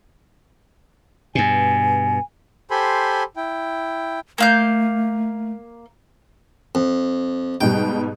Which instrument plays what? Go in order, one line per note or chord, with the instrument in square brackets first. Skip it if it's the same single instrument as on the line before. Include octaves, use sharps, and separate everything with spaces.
[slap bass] G2 B2 [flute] G#5
[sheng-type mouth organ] G4 A4 C5 G#5 B5 C6
E4 G5
[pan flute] A3 [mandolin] A#3 F5 G6
[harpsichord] F2
[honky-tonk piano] G#2 B2 G3 [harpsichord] G5